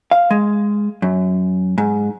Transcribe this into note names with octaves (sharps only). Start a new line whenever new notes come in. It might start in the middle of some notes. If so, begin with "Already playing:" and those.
F5
G#3
F#2
G#2